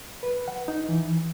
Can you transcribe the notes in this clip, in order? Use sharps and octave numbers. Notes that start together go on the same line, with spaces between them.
B4
F#5
D#4
E3